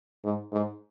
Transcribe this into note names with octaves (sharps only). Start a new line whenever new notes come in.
G#2
G#2